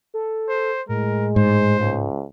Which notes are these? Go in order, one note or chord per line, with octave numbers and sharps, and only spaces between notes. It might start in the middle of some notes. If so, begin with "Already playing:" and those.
A4
C5
A2 G#3 A#4
G#2 C5
C#2